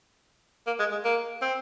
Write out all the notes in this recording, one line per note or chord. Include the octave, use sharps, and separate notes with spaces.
A#3
G#3
G#3
A#3
C4